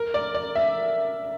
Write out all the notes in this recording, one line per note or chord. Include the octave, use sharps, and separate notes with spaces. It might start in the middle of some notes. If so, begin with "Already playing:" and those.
Already playing: A#4
D5
D5
E5